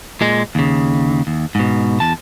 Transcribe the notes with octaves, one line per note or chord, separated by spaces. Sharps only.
A#2 G#3
D#2 C#3
D#2
G#2 B2
E2 A5